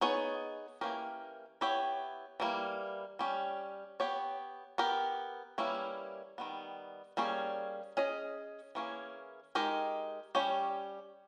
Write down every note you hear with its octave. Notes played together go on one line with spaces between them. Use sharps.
B3 D#4 G#4 C#5
E3 A#3 C#4 G4 A#4
B3 E4 G4 C#5
E3 G3 A#3
G3 C#4 G4
B3 G4 C#5
B3 G4 A#4
E3 G3 A#3 C#4 E4
D#3 G3 B3
G3 A#3 C#4 G#4
C#4 G#4 D#5
E3 A#3 C#4 G#4
G#3 D#4 G4 A#4
G3 C#4 G4 C#5